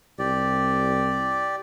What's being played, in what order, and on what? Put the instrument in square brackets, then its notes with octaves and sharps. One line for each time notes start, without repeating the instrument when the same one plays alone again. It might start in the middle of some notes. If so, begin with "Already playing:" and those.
[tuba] C2 [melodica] G4 D5